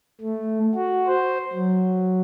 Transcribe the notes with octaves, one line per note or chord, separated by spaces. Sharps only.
A3
F#4
C5
F#3